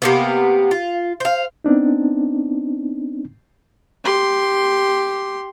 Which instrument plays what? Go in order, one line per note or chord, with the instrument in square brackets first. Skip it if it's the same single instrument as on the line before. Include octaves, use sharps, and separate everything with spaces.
[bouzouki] C3 A#3 B3
F4
C5 F5
[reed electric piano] B3 C4 D4 D#4
[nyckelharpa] G4 C6